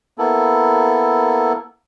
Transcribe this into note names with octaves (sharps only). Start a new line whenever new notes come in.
A#3 B3 E4 A4